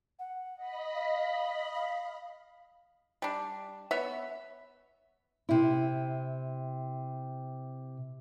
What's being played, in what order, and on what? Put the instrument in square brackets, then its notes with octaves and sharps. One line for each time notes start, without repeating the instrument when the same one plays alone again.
[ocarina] F#5
[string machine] D#5 B5
[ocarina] F5
F5
[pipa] G3 D4
B3 C#5 E5
[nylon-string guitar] C3 E4